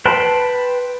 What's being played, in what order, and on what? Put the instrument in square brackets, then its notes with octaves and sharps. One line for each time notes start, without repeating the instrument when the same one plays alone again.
[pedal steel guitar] B4 G5 A5 B5 C6